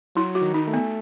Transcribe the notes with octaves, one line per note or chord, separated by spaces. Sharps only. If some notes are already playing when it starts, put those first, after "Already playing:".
F#3 E4
F#4
D#3
D#4
A3
B3